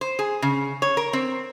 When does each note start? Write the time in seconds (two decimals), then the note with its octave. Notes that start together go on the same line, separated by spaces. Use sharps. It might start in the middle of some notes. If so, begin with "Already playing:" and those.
0.01 C5
0.19 G#4
0.42 C#3
0.82 C#5
0.97 A#4
1.13 C4